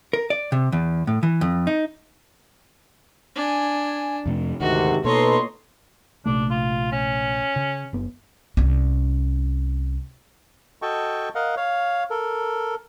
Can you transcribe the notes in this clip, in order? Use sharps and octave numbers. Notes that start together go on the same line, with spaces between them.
A#4
D5
C3
E2
A2
E3
F2
D#4
D4 G#5
F2 C3 A3
D2 G#2 C3 D#3 F#4 F#5
B2 A#3 D#4 A4 B4 C#5 D#5 C6
A#1 C3 A3 D4
F4
C#4
C#3
F#1 B3
C2 C#4
F#4 A4 D#5 G5 A5 C#6
A#4 D#5 F5 F#5
C#5 F5
A4 A#4